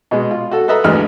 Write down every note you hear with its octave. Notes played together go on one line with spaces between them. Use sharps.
B2 G#3
F4
F#4 A4
A4 B4 D#5 E5 A#5
A1 D2 E3 G#3 F6